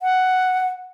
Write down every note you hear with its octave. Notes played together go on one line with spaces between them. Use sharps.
F#5